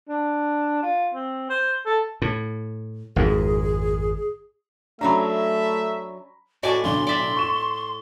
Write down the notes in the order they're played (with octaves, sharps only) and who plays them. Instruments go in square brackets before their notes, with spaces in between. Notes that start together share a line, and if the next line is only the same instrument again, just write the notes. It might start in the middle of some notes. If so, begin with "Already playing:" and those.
[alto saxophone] D4
F4
C4
C5
A4
[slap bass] A2
[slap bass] G#1 F2 G#2 [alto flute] G#4
[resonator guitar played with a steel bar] F#3 C#4 D4 [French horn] A3 [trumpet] E5 [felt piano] A#5 B5
[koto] A2 D5 G#5 [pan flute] F#4 [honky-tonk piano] D#5
[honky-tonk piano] B1 D3 D6 [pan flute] C6
[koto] D5 E5
[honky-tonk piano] C#6 E7